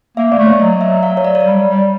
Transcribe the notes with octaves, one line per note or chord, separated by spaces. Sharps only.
A#3 E5
A#3 D5
A3
C#5
F#3 D#5
E5
F5
C#5
D5
C#5
D5
G3 C#5
G3